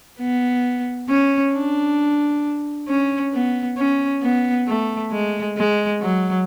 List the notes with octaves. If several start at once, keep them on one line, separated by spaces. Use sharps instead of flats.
B3
C#4
D4
C#4
B3
C#4
B3
A3
G#3
G#3
F#3